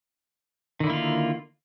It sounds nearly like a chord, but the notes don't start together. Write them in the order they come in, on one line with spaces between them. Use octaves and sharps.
D#3 D3 E4 A#3 F4